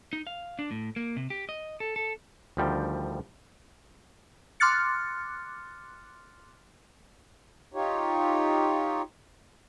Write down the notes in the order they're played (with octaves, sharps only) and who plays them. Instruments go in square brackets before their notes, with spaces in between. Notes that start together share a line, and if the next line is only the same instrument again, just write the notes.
[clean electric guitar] D#4
F5
D4
A2
A#3
C3
G4
D#5
A4
A4
[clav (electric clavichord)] D2 D#3 F3 G3 G5
[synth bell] C6 D6 F6 F#6 A6 C#7
[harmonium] D#4 F4 G4 C#5